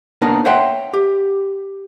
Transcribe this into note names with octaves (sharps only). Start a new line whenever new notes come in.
A#3 B3 D4 D#4 A#4
C5 C#5 E5 F#5 G5 C6
G4